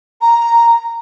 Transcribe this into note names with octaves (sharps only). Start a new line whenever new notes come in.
A#5